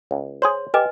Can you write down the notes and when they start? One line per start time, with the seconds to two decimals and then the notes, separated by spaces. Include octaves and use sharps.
0.11 C#2
0.42 G#4 C5 C#5 C6
0.74 G4 B4 D#5 G#5